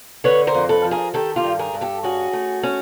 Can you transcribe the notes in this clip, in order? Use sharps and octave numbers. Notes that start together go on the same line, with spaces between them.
D3 B4 C#5
A#4 C5
F2
A4 B4
F3
G#4 A#4
D#3 G4 A4
F4 G4
G2
G#4 A#4
G2
G4 A4
C#4 F#4 G#4
A3
C#4